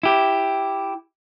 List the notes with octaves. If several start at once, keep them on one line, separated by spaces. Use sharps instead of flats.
E4 G4